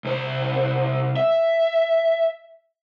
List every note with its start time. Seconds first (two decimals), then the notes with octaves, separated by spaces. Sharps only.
0.05 C2 C5
1.17 E5